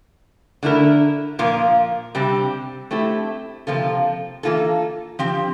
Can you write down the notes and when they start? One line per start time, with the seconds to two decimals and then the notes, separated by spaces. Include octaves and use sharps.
0.63 D3 A3 E4 A#4
1.39 A#2 F3 A#3 F4 A#4
2.15 C3 G3 C4 G4
2.91 A3 C4 E4 G4
3.67 C3 F3 A#3 F4 A4
4.43 E3 A#3 F4 A4
5.19 F3 C4 G4